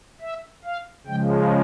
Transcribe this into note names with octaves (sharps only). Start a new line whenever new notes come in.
E5
F5
C#3 F3 G#3 G5